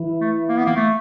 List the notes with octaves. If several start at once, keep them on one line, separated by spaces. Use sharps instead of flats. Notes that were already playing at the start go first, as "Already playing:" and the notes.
Already playing: E3
A3
A#3
B3
A#3
A3